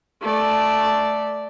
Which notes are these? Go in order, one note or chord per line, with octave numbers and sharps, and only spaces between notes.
A3 D5